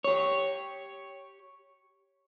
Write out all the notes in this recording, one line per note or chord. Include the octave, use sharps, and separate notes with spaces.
G4 C#5